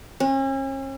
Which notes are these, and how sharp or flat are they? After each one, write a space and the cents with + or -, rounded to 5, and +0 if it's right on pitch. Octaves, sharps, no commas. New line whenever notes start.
C#4 -40